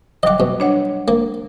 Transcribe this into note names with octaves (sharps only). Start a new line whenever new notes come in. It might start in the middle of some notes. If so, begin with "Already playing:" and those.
F#3 G3 D#5 F#5 D6
B2
D4 C#5 F#5
A#3